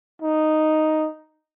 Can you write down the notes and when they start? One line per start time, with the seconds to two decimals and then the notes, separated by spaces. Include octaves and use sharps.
0.22 D#4